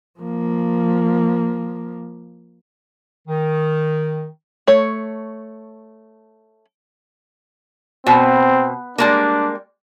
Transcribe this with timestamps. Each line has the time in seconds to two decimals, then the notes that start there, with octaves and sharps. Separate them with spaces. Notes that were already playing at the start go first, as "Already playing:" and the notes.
0.20 F3 A#3
3.28 D#3
4.67 A3 C#5
8.07 B2 C4
8.98 G3 G#3 A#3 D4